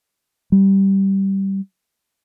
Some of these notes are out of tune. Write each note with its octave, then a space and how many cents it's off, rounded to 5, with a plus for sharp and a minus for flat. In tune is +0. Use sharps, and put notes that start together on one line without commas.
G3 -10